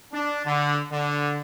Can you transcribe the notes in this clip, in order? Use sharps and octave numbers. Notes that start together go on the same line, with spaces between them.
D4
D3
D3